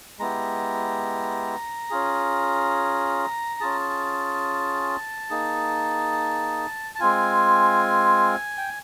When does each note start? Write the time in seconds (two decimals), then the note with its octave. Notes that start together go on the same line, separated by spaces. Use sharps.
0.19 G#3 B3 E4 G4 A#5
1.90 C#4 F4 G#4
3.60 C#4 F4 G#4 A5
5.30 A#3 D#4 G#4
6.95 A5
7.00 G#3 C4 F4 G#5
8.58 G5